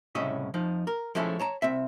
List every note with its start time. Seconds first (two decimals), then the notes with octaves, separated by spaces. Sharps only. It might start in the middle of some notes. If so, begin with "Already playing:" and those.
0.15 C2 A2 C#3 C#4 D#5 E5
0.54 F2 F3 D#4
0.87 A#4
1.15 F3 G#3 A3 C#4 E4
1.39 C#5 A5 A#5
1.62 C2 C4 E5